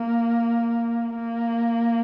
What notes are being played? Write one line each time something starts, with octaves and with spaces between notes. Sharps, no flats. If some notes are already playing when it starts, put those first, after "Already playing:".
Already playing: A#3
A#3